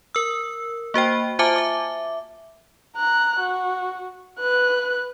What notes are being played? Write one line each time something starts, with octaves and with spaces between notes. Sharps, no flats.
A#4 E6
A#3 F#4 C5 G5
F4 C5 E5 G#5 A5 D6
E5 D6
A#5 F#6
F#4
B4 F#6